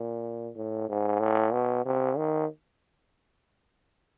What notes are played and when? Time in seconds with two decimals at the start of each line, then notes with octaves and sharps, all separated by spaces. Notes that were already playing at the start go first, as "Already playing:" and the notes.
Already playing: A#2
0.56 A2
0.89 G#2
1.20 A2
1.53 B2
1.85 C3
2.17 D#3